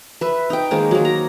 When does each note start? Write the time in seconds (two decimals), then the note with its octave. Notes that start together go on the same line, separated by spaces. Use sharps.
0.21 B4 E5
0.50 D#4 G5
0.71 D#3 G#3 A#3 C5
0.91 F#3 A#3
1.05 A#5